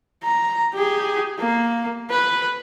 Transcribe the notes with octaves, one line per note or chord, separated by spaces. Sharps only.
A#5
G4 G#4
A#3
B4